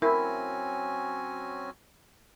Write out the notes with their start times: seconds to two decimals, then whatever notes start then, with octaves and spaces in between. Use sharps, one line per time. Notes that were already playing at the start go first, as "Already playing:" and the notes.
0.02 F#3 C4 C#4 E4 F#4 A#4 G#5